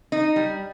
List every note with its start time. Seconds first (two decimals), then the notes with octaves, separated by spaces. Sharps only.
0.12 D#4
0.36 G3